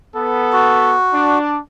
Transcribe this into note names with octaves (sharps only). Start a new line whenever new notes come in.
B3 A4
F#4
D4